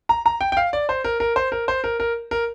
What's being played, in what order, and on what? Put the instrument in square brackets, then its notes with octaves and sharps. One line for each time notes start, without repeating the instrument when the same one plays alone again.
[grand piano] A#5
A#5
G5
G5
F5
D5
C5
A#4
A#4
C5
A#4
C5
A#4
A#4
A#4